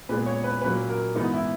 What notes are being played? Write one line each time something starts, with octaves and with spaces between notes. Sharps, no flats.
A#2 G#3 B3 B4
C#5
B4
A#2 F#3 A#3 C#4 B4
A#4
G#2 E3 B3 D#4
E4